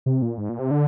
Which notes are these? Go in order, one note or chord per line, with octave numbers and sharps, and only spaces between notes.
C3
A#2
G#2
A#2
C3
D3